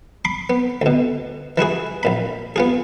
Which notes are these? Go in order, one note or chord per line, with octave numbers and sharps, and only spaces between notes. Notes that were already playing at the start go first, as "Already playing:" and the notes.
B5 C6 D6
B3
D2 B2
E3 E4 F#4 G#4
A#1 A#2 B5
B3 F4 G#4